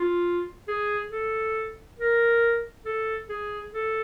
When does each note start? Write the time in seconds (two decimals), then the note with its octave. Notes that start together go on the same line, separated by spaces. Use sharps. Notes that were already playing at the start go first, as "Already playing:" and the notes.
Already playing: F4
0.68 G#4
1.11 A4
1.99 A#4
2.86 A4
3.29 G#4
3.73 A4